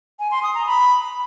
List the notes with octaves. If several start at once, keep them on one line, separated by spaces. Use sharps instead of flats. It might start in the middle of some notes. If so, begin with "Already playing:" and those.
G#5
C6
D#6
A#5
B5